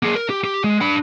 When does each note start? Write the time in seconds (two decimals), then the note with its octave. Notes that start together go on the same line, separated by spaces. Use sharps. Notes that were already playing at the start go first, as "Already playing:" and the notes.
0.03 A#3 G#4
0.15 A#4
0.30 G4
0.44 G4
0.64 G#3
0.81 D4 B5